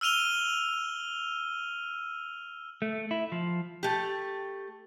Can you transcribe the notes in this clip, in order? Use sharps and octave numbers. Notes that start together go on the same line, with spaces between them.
E6 F6 D#7 F7 G7
A3
E4
F3
A3 G4